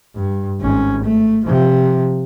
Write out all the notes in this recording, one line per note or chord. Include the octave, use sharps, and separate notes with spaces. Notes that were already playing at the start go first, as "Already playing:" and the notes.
G2
G#1 C#4
A3
C3 F3